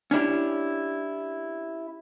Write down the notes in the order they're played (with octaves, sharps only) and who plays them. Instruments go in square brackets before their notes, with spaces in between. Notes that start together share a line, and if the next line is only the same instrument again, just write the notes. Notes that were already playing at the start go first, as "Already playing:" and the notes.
[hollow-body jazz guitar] C#4 D4 E4 G4